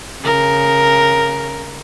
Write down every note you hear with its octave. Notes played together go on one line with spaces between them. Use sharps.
C#3 A#4